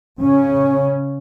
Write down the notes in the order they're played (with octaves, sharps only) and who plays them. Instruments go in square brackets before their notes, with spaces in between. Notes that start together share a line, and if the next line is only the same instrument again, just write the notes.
[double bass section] C#3 C#4